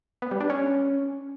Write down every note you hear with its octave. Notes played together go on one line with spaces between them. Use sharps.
B3
G3
D4
C#4